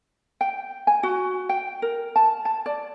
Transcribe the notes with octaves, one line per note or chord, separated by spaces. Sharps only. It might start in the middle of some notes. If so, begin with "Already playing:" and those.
G5
G#5
F#4
G5
A#4
A5
A5
D5